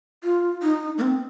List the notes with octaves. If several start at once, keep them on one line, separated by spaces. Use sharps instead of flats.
F4
D#4
A#3
C4